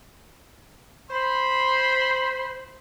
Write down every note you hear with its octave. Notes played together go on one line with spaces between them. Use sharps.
C5 B5 C6